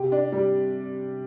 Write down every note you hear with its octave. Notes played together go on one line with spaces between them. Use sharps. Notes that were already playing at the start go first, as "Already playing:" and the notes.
Already playing: C3 G4
D4
G3